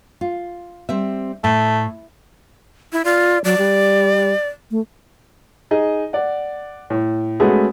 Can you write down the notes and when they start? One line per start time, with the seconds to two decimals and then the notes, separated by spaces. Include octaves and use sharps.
0.21 F4
0.89 G3 C4 E5
1.44 A2 A3
2.93 E4
3.05 F4 D5
3.44 F#3 D5
3.58 G3
4.71 A3
5.71 D#4 G#4 D#5
6.13 D5 F#5
6.90 A2
7.40 G#3 A3 B3 C#4 F#4 G#4